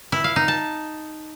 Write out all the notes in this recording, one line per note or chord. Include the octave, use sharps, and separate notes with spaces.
E4
F5
D#4
A5